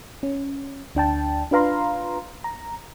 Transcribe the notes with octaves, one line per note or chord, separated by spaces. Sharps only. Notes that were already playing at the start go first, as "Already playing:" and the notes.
C#4
D2 D4 G5 A5
D4 F4 B4 F5 A#5 C6
A#5